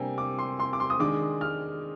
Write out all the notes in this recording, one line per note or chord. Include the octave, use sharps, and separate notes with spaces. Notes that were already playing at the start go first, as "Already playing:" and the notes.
Already playing: C3 G3 A#3 D4 G5 G#5
D6
C6
C6
D6
C6
D#6
D#3 G#3 D4 D6
F6